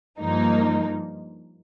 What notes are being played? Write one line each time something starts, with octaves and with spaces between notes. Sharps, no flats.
G2 F3 A#3 D#4